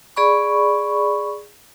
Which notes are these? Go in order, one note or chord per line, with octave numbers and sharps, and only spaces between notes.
G#4 D5 B5 C#6